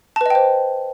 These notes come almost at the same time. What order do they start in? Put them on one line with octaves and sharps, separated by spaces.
A5 B4 D#5 G5 C5